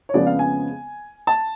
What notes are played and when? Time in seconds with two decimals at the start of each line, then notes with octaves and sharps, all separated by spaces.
0.09 C#5
0.14 F2 C#3 F3 G#3 B3 D5
0.27 F5
0.39 G#5
1.27 A5